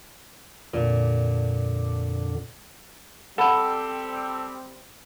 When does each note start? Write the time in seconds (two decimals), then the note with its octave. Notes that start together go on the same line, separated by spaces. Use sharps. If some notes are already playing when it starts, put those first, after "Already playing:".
0.74 F2 A#2 D3
3.38 G3 C4 A4 F#5 B5